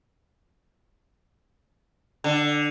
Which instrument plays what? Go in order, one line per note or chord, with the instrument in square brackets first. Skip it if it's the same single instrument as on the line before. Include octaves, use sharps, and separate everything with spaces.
[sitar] D3